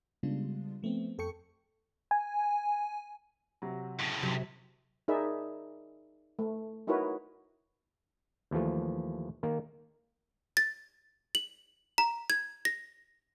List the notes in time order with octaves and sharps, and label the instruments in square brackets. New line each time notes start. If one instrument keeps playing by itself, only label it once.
[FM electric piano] C#3 G3 G#3 B3 D4 F4
F3 A3 B3 C4
F2 A4 G5 C#6 C#7
G#5
[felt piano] C3 F#3
[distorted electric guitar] A2 C#3
[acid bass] C3 [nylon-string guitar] F#3 [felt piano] B6
[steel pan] D#4 G#4 A#4 D5 E5 B5
A3
D#4 E4 F#4 A#4 B4 C#5
[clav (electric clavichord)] D#2 E3 F3 A3
D#3 A#3
[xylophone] A6
F#7
A#5
G#6
A#6